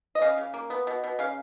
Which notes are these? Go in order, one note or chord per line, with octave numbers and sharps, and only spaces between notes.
D#5
C#3 F5
C#3
A#3
B3
B2
B2
C#3 F5